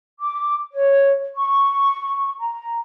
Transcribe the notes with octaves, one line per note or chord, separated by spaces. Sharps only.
D6
C#5
C#6
A#5